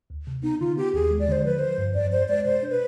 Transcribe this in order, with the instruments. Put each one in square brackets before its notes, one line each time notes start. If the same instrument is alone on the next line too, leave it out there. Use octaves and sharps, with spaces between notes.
[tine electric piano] D2
C3
[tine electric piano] B3 [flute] D#4
[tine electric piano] D3 [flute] F4
[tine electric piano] B3 [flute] G4
[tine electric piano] D#2 [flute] G#4
[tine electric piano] G#3
[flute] D5
[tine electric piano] D3 [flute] C5
[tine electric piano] F3 [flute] B4
[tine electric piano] F3 [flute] C5
[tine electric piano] G2
[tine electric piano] F2 [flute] D5
[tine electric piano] F2 [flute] C5
[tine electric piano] G#3 [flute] D5
[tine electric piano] B2 [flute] C5
[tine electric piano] D4
[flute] B4